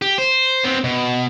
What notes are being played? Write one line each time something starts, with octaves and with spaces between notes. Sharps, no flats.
G4
C5
B3 C4
B2